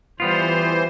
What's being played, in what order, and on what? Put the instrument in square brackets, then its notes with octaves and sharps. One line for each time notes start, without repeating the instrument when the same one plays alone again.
[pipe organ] E3 C5 [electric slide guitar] G3 B3 F4